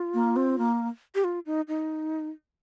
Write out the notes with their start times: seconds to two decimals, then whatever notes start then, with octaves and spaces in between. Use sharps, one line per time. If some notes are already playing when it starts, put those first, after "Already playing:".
Already playing: F4
0.14 A#3
0.36 C4
0.58 A#3
1.15 G4
1.24 F4
1.46 D#4
1.68 D#4